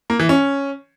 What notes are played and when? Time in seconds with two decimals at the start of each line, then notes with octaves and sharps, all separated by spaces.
0.10 A#3
0.19 E3
0.29 C#4